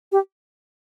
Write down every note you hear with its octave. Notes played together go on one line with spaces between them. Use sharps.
G4